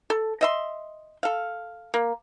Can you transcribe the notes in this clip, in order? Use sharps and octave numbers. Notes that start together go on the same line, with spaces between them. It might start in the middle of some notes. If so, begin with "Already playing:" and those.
A4
D#5 E5 C6
A4 F5
A#3